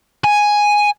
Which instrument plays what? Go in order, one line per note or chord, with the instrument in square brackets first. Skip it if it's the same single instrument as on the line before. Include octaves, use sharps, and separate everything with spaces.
[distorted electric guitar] G#5